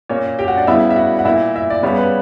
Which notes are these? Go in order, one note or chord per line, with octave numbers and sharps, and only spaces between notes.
A#2 A#3 C#4 C#5
G4 G5
F#4 F#5
D4 D5
C#3 G3 B3 E4 E5
E5
F#4 F#5
F#5
A#2 A#3 E4 E5
E5
D5
C#3 G3 B3 C#5
B4